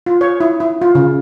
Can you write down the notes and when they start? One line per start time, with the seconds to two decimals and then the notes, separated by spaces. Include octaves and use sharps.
0.06 F4
0.21 C#5
0.40 E4
0.60 E4
0.82 F4
0.95 C#3